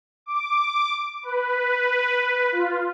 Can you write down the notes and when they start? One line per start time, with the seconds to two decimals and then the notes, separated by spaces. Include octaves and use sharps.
0.26 D6
1.23 B4
2.52 F4